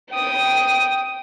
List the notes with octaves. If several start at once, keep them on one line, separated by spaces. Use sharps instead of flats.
G5 D#6